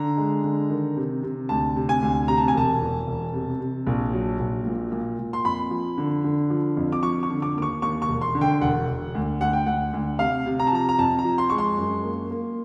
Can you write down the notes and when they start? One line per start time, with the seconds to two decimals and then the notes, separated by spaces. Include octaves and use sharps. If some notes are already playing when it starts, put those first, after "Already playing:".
Already playing: D3 A#5
0.17 G#3
0.44 D3
0.70 D#3
0.97 C3
1.23 C3
1.49 D2 A5
1.76 C3
1.89 G#5
2.02 D2
2.28 C3 A#5
2.38 A5
2.48 G#5
2.54 E1 A5
2.82 E2
3.07 E1
3.33 C3
3.60 C3
3.87 A#1
4.13 F#3
4.39 A#1
4.66 A#2
4.92 A#2
5.19 A#2
5.33 C6
5.45 F2 B5
5.71 F3
5.98 D3
6.24 D3
6.50 F3
6.77 F2
6.92 D6
7.03 F3 C#6
7.23 C#6
7.30 D3
7.42 D6
7.56 D#2 D6
7.62 C#6
7.82 D#2 C#6
8.02 C#6
8.09 E1
8.21 C6
8.35 D3
8.41 G5
8.61 E1 F#5
8.88 E1
9.15 D2
9.41 D2 F#5
9.53 G5
9.66 D2 F#5
9.93 D2
10.19 C3 F5
10.46 C3
10.60 A#5
10.67 A5
10.72 F3 A#5
10.89 A#5
10.99 F2 A5
11.19 A#5
11.25 F3
11.38 C6
11.50 G#3 C#6
11.58 C6
11.77 F#2
12.04 A#3
12.31 A#3